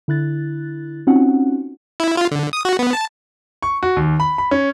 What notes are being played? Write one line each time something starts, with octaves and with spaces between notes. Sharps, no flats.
D3 E4 F#6 A6
C4 C#4 D#4 F4 F#4 F#5
E4
F4
D3
D#6
F#4
B3
A5
C#6
F#4
D#2
B5
B5
C#4